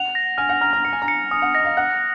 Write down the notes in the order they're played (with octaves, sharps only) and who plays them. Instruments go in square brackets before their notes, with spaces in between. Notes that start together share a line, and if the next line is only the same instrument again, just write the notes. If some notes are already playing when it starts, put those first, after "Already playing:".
Already playing: [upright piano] F#5 [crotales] F7
[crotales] A#6
[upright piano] G#5 [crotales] F6
[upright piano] F#5
[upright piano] A#5 [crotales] F6
[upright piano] A#5
[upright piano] A#5 [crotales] C#7
[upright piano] G#5
A#5
[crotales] C#7
[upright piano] G#5 [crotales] D#6
[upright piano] F#5
[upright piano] D#5 [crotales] A#6
[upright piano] F5
[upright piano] F#5 [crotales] F#6